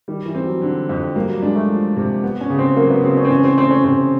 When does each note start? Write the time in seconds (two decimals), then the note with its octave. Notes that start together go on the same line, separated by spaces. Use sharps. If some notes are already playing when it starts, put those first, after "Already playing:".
0.08 D#3 G3
0.26 E3
0.35 C4
0.44 F#3
0.62 D3
0.89 F2
1.16 G3 A#3
1.29 F#3
1.42 G#3 D4
1.56 A3
1.69 F3
1.97 C3
2.23 B3
2.41 C#4
2.50 C#3
2.59 C4
2.76 F#3 A#3
2.90 B3
3.04 C#3 C4
3.17 C#4
3.25 C4
3.30 E3 C#4
3.44 C4
3.57 A3 C4
3.70 C#4
3.84 C3 C4